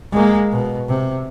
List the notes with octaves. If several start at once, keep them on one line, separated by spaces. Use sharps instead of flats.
G#3 A#3
B2
C3